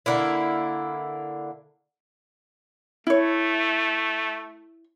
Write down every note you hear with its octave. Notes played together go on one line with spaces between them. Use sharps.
D3 A#3 E4
A3 E4 C#5